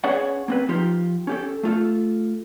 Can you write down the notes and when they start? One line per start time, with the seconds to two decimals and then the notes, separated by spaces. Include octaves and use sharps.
0.04 C#4 G#4 B4 C#5 D5 F#5
0.48 A#3 C4 B4
0.69 F3 D#4 F4 G4
1.27 C#4 G4 A4
1.63 A3 F4 A4